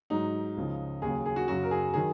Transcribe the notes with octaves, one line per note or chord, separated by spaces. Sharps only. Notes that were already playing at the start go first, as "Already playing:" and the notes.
G#2 F#3 D#4
C#2 C#3 F3
D#2 C#3 F#3 G#4
G#4
F#4
F#2 C#3 F#3 F#4
A#4
G#4
D#3 F#3 G#4